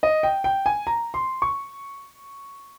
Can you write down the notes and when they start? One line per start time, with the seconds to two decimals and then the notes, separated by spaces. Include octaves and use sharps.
0.03 D#5
0.23 G5
0.44 G5
0.66 G#5
0.87 A#5
1.14 C6
1.42 C#6